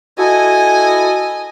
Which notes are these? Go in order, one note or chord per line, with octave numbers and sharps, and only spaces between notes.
E4 F#4 A4 D#5 G#5